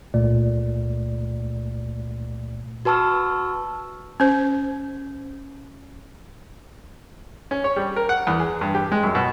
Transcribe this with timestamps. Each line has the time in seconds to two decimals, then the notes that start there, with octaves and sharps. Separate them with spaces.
0.14 C#2 A#2 A3 D5
2.85 F#4 B4 A5 C#6 E6 F6
4.20 C#4 C5
7.51 C#4
7.64 C#5
7.76 G3
7.96 A#4
8.09 F#5
8.27 E2
8.40 G#4
8.61 G2
8.75 G4
8.92 G#3
9.03 F#2
9.15 B2